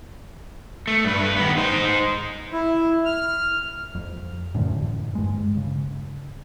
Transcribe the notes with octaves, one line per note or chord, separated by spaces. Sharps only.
A3
G2 B4
D#3 B3
D#4 C5
E4
F6
F2
F#2 A2 D3 E3
G2 G#3
C#3